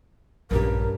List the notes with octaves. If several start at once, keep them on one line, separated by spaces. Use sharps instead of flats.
A#1 G2 C#4 G4 A#4